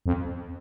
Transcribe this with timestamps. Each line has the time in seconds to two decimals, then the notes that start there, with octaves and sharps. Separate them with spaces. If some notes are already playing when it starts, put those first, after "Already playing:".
0.06 F2